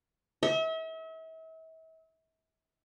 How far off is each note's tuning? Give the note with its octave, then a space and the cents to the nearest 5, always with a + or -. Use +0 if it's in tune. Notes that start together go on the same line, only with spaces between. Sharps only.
E5 -40